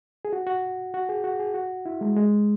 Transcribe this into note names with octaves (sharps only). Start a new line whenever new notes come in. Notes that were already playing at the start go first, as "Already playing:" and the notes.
G#4
F#4
F#4
F#4
G#4
F#4
G#4
F#4
E4
G#3
G#3